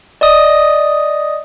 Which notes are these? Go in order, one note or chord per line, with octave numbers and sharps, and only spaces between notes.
D5 D#5 D#6